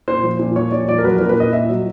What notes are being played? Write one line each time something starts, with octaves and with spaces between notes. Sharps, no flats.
A#2 C5
F3
A#2
F3 C#5
A#2 D5
F3 D5
A#4
F#3 B4
A#4
A#2
B4
A#2 D#5
A#2 E5
F#3